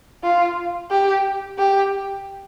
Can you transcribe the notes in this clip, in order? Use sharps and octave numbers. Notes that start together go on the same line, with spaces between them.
F4
G4
G4